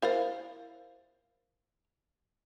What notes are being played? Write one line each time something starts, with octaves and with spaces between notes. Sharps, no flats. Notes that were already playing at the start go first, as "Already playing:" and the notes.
E4 A#4 C5 F5